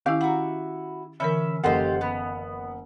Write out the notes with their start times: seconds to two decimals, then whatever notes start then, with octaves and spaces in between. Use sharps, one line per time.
0.06 D#3 C#4 E4 G4 F5
0.21 E4 F#4 F#5 A#5
1.20 D3 E3 C#4 A#4 E5 B5
1.64 F#1 F4 G4 A4 C5 D#5 F#5
2.01 B3